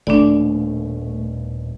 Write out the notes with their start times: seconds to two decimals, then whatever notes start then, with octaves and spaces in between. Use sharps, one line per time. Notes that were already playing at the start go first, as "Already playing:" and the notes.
0.07 D#1 D#2 B2 A3 D4 D5